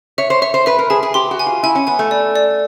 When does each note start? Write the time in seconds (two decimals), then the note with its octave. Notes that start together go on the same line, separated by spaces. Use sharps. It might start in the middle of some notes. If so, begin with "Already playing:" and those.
0.18 C#5 E5
0.30 C5
0.42 C#5 E5
0.54 C5
0.66 B4 E5
0.79 A#4
0.90 G#4 A5
1.03 G#4
1.14 G4 C6
1.31 F#4
1.39 G#5
1.47 F4
1.63 E4 G#5
1.75 C#4
1.87 B3 G#5
1.99 A3
2.11 D5
2.36 D5